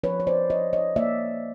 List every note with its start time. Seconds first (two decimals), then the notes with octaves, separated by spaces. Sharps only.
0.03 F3 B4 C#5
0.20 C#5
0.27 C5 D5
0.50 F3 C#5 D#5
0.73 C#5 D#5
0.96 A#3 D5 E5